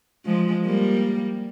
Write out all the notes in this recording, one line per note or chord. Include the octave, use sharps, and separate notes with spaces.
F3 G#3
G3 A#3